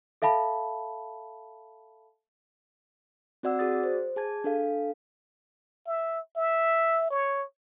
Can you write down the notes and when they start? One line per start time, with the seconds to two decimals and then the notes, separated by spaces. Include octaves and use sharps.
0.22 A4 E5 F5 A5 B5
3.43 C4 F#4 D5 F#5 E6
3.59 F#4 G#4 D5 D#6 A6
3.83 C5
4.16 G#4 A5 G#6
4.44 D4 A4 F5
5.87 E5
6.37 E5
7.10 C#5